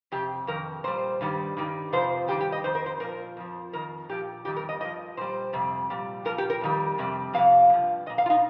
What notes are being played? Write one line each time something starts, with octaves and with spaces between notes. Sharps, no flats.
F2 C3 G4
F2 D#3 A#4
A#2 G3 C5
G2 D#3 G3
G2 D#3 G3
F2 C3 F3 C5
G2 D#3 G3 G4
G4
D#5
F2 D#3 C5
A#4
C5
A#2 F3 A#4
F2 F3
F2 D#3 A#4
A#2 F3 G4
F2 D#3 G3 G4
A#4
D#5
G2 F3 D#5
A#2 G3 C5
F2 C3 G3
A#2 G3
A#2 F3 A#4
G4
A#4
F2 D#3 G3
F2 C3 G3
F2 C3 F3 F5
G2 F3
F3 D#5
A#2
F5
F4
D#4